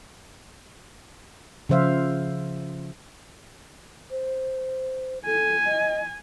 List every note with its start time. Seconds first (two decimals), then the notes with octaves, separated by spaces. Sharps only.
1.69 C#3 F3 C5 E5 F5
4.11 C5
5.26 A4 G#5
5.65 D#5